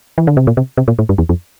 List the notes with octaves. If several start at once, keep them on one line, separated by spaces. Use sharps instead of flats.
E3
D3
C3
A#2
C3
C3
A#2
A2
G2
E2
F2